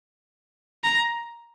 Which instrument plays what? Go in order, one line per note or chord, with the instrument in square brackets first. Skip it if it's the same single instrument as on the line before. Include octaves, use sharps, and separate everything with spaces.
[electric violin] A#5